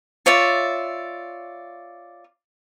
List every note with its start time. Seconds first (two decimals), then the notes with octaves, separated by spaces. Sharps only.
0.26 F4 C#5 D5 E5